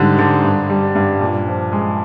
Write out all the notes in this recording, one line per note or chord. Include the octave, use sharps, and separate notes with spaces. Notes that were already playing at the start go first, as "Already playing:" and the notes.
Already playing: G#2 D3 G3
D3
G2
G3
G2
A#2
F3
G#3